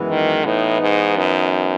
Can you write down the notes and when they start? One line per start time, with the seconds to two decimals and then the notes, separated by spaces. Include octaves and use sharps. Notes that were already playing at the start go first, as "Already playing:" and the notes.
Already playing: F#2 E3 G#3 B3
0.10 D#3
0.45 A2 E3 B3 D#4
0.81 G#2
1.17 F#2